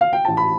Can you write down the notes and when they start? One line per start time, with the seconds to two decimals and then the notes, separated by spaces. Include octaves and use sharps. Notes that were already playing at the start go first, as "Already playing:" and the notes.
0.01 F5
0.13 G5
0.25 A1 A5
0.37 B5